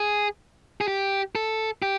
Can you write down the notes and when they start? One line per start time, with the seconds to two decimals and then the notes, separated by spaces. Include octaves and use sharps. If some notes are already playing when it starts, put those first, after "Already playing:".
Already playing: G#4
0.81 G#4
0.88 G4
1.35 A4
1.82 G4